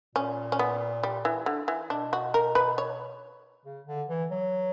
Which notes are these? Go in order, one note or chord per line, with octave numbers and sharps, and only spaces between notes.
A#2 C#4
C#4
B3
G3
E3
D3
E3
B2 D4
F#4
A#4
B4
C#5
C#3
D3
E3
F#3